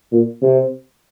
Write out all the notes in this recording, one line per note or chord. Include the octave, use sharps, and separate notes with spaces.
A#2
C3